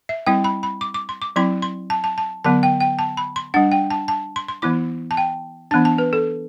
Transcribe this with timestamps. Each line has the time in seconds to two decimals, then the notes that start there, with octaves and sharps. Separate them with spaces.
0.09 E5
0.27 G3 C4 E4 G5
0.44 B5
0.63 B5
0.81 D6
0.94 D6
1.09 C6
1.22 D6
1.36 F#3 C4 E4 C6
1.62 C6
1.90 A5
2.04 A5
2.18 A5
2.45 D3 F#3 B3 A5
2.63 G5
2.80 G5
2.99 A5
3.17 B5
3.36 C6
3.54 G3 D4 F#5
3.72 G5
3.90 A5
4.08 A5
4.36 C6
4.48 C6
4.62 E3 B3 E4 D6
5.11 A5
5.17 G5
5.71 E3 B3 D4 A5
5.85 A5
5.98 B4
6.13 A4